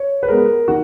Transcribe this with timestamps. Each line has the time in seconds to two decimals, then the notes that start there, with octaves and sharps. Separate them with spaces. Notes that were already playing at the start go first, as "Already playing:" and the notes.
Already playing: C#5
0.23 B4
0.28 G#3 B3 A#4
0.68 D#3 F#4